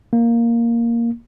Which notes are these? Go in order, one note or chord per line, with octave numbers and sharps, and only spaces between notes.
A#3